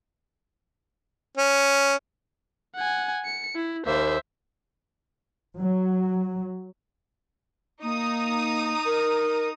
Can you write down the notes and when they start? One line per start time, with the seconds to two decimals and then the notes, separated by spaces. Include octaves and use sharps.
1.37 C#4
2.75 F#5 G#5
3.25 C#7
3.55 E4
3.86 D#2 A#3 C5 E5
5.60 F#3
7.83 A#3 D#4 A#5 D#6
8.86 A#4